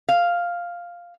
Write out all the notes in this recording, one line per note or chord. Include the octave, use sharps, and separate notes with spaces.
F5